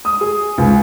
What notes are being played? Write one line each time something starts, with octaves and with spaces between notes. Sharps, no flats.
D#6
G#4
C#2